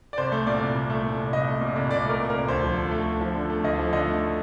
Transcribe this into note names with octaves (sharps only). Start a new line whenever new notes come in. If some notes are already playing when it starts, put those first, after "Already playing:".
D5
C2 C5
A3
A#2 D5
C2
C2
A3
A#2
C2
C2 D#5
A3
A#2
C2
C2 D5
A3 A#4
A#2
C2 A#4
D2 C5
F3
D3
A3
D2
F3
D3
A3
D2 D#5
F3
D3 D#5
A3